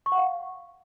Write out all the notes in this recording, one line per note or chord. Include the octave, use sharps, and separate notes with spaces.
C#6
F#5
F5